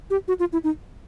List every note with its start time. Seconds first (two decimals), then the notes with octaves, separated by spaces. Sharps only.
0.10 G4
0.28 F#4
0.40 F4
0.53 E4
0.64 D#4